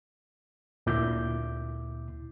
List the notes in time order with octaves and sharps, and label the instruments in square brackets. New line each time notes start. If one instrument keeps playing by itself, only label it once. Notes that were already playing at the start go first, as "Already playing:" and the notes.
[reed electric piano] D2 A#2 E4 D6 G6